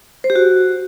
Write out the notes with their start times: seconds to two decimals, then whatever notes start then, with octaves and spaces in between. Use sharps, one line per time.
0.24 C5
0.30 G4
0.36 F#4